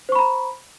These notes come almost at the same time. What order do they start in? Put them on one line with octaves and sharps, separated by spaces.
C5 C#6 B5 A#5